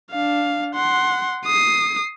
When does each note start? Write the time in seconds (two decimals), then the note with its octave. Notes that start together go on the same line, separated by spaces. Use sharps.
0.11 D4 F5
0.75 F#5 C6
1.46 D#6 C7